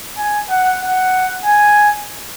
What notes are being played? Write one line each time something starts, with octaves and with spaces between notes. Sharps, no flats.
G#5
F#5
F#5
G#5